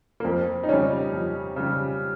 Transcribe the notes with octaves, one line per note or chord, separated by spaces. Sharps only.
A#3
F2 C4
D#4
C#3 G3 C#4
F2
C#3 G3